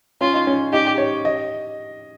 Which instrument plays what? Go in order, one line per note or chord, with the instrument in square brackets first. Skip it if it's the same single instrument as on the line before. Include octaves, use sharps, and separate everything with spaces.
[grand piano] C#4 [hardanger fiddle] F4
[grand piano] D#4
C#4
[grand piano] D#4 [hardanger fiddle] G4
[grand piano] C#5
D#5